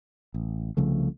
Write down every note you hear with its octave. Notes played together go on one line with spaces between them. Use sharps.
A1
C2 C#3 F3 A3